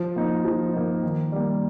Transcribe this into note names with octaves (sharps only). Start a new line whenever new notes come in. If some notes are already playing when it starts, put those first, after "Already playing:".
Already playing: F3
A#3 D#4
F3
A#3 D#4
D#3
G3 A#3